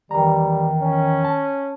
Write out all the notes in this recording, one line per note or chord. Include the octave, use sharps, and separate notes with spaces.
E2 D#3 G3 A#5
C#4
A5